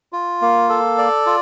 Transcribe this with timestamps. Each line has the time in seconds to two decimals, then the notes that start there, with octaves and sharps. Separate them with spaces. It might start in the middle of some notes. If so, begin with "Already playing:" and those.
0.13 F4
0.42 A#3
0.69 A4
0.98 D5
1.26 F4